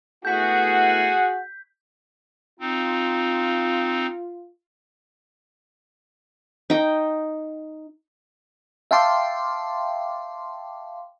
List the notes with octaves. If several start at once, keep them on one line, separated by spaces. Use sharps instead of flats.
A3 B3 E4 F#4 G#4 F#5 G6 B6
C4 D#4 F4
D#4 G5
E5 F5 G5 A5 C6 D6